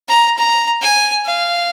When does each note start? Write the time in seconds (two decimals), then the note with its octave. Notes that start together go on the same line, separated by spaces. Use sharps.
0.08 A#5
0.38 A#5
0.82 G#5
1.26 F5